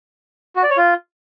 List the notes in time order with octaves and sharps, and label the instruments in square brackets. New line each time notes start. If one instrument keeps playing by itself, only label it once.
[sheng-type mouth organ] F#4
D5
C#5
F4